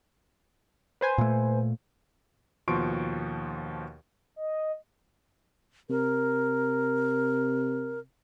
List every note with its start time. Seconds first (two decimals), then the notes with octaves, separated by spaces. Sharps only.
1.01 B4 C5 G#5
1.18 A#2 A3
2.68 D#2 B2 F3 C6 C#6 D7
4.36 D#5
5.90 C3 A#4